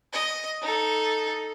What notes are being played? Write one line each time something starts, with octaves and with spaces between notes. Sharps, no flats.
D#5
D#4 A4